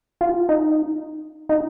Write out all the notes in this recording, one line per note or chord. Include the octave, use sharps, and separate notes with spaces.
F4
D#4
D#4